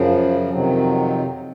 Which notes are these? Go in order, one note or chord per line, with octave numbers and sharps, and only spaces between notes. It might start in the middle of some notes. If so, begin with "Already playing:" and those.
Already playing: F#2 C#3 F3
F3
F2 C3 D#3 F#3